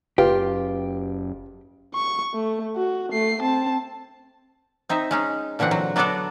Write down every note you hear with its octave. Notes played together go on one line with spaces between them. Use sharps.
F#1 F4 G4 B4
C#6
A3
F#4
A3 C7
C4 A5
C4 D#4 D#5 E5
G#3 C#4 D#4
A#2 D3 E3 C4 F#5
F#3
F#3 B3 D4 F#4 A4 D5